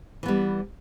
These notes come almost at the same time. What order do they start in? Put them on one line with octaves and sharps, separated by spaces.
E3 B3 G3